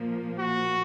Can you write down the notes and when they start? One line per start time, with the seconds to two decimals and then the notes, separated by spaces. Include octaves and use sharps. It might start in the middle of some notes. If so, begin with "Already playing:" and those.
Already playing: A#2 F3 A#3
0.39 F#4